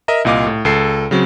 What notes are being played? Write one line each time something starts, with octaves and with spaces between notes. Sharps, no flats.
A#4 D#5 E5 A#5
C2 A#2 D#5 F5 D6
A2
C#2 A4 C7
C#3 F#3 C4